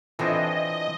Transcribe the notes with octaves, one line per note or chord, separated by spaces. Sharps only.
E3 C4 D4 E4 F4 A4 D#5